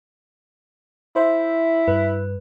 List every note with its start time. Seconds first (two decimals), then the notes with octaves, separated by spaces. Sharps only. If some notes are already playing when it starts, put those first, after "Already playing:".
1.16 E4 C5 E5
1.88 G2 B4